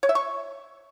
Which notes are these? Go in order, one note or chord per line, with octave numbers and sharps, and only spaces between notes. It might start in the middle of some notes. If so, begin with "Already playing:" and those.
C#5
E5
C#6